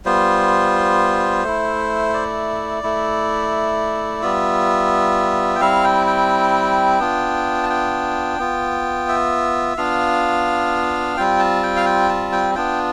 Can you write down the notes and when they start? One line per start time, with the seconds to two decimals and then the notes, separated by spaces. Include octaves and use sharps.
0.05 G3 B3 F4 C5
1.44 A3 E4
2.14 D5
2.83 A3 E4
4.22 G3 B3 F4 E5
5.56 G5
5.60 G3 C4 E4 F5
5.84 G5
6.07 G5
6.99 B3 D4 F4
7.63 A5
7.70 G5
8.39 B3 F4
9.08 E5
9.77 B3 D4 F4 F5
11.17 G3 C4 F4 G5
11.39 A5
11.63 G5
11.77 F5
11.86 G5
12.09 A5
12.32 G5
12.55 B3 D4 F4 G5